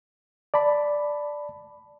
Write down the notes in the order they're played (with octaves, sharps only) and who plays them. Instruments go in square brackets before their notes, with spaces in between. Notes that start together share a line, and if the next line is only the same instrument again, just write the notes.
[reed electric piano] D5 A5 B5